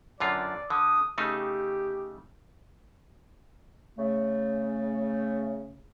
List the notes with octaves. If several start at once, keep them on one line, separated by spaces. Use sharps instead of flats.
F#2 D3 F4 D5
D3 D#6
C#3 A3 D#4 G4
C#3 A3